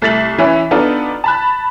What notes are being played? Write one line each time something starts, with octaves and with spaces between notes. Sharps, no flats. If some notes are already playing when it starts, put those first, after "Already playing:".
C2 A3 A6 B6 F#7
E3 C#4 E4
B3 D4 D#4 F4 A4
A5 B5 F#6